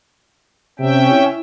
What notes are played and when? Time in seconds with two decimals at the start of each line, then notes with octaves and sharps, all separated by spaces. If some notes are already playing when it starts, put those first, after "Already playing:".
0.79 C3 C#4 E5 G5
1.11 E4